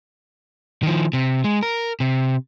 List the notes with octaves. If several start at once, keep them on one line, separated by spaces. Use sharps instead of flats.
D#3 F3
C3
G#3
A#4
C3